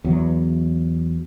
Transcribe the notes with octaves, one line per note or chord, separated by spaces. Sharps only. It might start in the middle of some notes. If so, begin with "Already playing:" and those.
E2 F#3